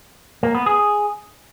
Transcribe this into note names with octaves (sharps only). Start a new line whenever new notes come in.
A#3
B3
G#4